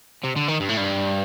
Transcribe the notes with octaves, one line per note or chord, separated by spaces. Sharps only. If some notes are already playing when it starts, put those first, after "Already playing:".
C3
D3
D#3
G2
A2
G2